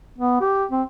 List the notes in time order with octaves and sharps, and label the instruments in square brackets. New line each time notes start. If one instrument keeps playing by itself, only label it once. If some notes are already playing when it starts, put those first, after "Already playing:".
[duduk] B3
G4
C4